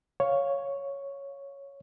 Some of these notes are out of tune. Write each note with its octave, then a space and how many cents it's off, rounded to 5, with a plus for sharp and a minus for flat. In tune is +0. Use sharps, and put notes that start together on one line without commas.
C#5 +0 F5 +0